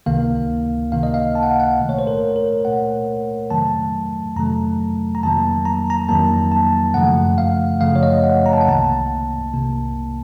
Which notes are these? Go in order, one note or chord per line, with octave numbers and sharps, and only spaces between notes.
C#2 C3 D#3 A#3 F5
C#2 C3 D#3 A#3 F5
D#5
F5
A5
F#5
F5
F#5
A#2 A3
C#5
C5
A#4
A#4
A#2 A3 F#5
F2 C3 D#3 F#3 A3 A5
F2 C3 D#3 F#3 A3 A#5
A#5
F2 D#3 F#3 A#3 A5
A#5
A#5
F2 D#3 F#3 A#3 A5
A5
F#2 C#3 F3 A3 F#5
F5
F#2 C#3 F3 A3 F5
C#5
D#5
F#5
A#5
A5
F#5
C2 C3 D#3 A#3 A5
C2 C3 D#3 A#3